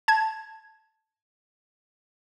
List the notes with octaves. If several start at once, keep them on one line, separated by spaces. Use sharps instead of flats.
A5 G#6